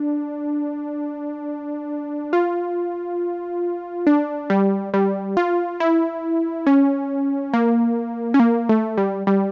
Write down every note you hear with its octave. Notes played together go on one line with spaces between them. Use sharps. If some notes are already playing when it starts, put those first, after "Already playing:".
Already playing: D4
F4
D4
G3
G3
F4
E4
C#4
A#3
C#4
A#3
A3
G3
G3